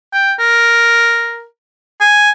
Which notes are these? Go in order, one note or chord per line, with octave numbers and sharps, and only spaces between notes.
G5
A#4
G#5